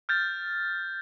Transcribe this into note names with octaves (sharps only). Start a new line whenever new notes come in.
F6 G6 A6